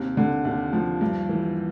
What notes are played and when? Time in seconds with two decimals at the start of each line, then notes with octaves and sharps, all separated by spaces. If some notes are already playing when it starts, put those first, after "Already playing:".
Already playing: D#2 C3
0.17 D3
0.45 D#2
0.73 F3
1.01 G2
1.29 E3